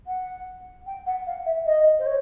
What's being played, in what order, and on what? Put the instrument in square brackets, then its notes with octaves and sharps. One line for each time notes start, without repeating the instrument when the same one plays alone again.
[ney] F#5
G5
F#5
F5
E5
D#5
C5
C#5